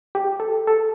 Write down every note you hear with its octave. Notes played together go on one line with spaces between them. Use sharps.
G4
A4
A4